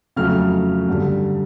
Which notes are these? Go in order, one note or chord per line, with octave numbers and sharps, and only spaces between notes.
F2 C#3 F#3 A3 F6
G2 D3 G3